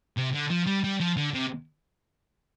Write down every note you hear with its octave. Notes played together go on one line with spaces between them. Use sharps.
C3
D3
F3
G3
G3
F3
D3
C3